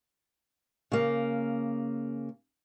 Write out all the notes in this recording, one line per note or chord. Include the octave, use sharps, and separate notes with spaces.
C#3 A#3